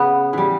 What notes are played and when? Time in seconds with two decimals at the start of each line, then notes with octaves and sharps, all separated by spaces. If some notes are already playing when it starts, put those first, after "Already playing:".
Already playing: C#3 B3
0.33 E3 G3